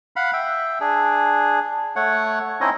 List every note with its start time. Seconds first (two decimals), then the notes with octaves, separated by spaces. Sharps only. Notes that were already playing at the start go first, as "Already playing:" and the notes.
0.16 F5 F#5 B5
0.33 E5 G5
0.81 D4 G#4
1.96 A3 C#5 F#5
2.61 C4 C#4 D#4 E4 D#5